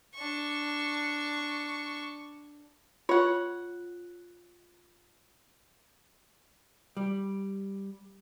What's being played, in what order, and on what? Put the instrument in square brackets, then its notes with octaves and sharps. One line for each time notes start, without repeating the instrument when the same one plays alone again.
[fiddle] D4 C#6
[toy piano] F4 [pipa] C#5 F#5
[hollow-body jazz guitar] G3